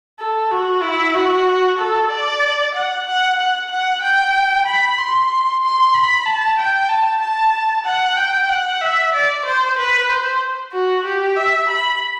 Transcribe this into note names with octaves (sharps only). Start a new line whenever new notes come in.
A4
F#4
E4
F#4
A4
D5
F#5
F#5
F#5
F#5
G5
B5
C6
C6
B5
A5
G5
A5
A5
F#5
G5
F#5
E5
D5
C5
B4
C5
F#4
G4
E5
B5